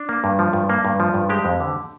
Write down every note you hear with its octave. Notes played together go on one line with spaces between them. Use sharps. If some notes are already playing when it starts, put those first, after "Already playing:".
Already playing: D4
A#3
G2
F3
G2
A#3
G2
F3
G2
G#3 G4
F2
D3